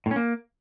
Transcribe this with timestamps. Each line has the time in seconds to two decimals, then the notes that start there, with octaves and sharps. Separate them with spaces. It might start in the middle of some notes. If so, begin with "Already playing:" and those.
0.06 A2
0.11 C#4
0.16 A#3